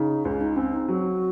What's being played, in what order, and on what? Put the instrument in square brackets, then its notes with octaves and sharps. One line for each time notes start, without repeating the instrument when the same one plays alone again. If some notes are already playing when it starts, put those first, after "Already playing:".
Already playing: [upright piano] C#3 [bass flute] D#4
[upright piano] C#2 [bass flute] C#4
[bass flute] D#4
[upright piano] C4 [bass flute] C#4
[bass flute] D#4
[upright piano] F#3 [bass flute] F#4